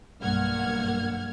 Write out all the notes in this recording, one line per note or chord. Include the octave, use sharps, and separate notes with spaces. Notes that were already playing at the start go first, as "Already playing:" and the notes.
B1 G2 A#3 F#5 F6 G#6